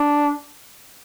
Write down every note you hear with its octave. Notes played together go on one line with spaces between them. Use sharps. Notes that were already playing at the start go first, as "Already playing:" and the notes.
Already playing: D4